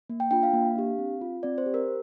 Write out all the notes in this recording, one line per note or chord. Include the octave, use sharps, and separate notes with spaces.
A#3
G5
D4 F4 G5
F5
A#3
D4 G4
C4
F4
C4 D5
C5
G4
A#4